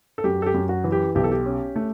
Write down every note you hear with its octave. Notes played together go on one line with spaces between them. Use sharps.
A4
F#2 G4
A4
G4
F#2
F#4
E3
G4
B1 G4
A4
G4
C#4
A3